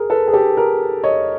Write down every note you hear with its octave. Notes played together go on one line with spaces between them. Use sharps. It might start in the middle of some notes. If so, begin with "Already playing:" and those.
Already playing: G#4 A#4
A4 B4
G#4
G4 A4
G#4 A#4
C#5 D#5